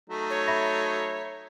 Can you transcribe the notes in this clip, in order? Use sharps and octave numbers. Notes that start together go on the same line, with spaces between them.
F#3 A3 D#4
C#5
E5 B5 A#6